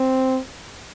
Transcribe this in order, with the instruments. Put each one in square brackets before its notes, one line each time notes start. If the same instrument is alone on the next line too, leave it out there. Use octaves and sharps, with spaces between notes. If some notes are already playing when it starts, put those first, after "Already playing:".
Already playing: [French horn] C4